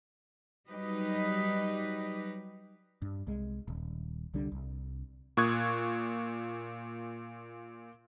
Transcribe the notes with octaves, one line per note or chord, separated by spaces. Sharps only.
F#3 G3 D#4 G4 B4 D#5
G2
C2 G#3
D#1
C2 D3 G3 D4
C2
A#2 C#6 D#6 F#6 G#6